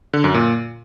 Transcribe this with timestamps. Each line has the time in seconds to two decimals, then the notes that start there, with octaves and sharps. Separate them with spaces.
0.13 D3
0.24 F#2
0.34 A#2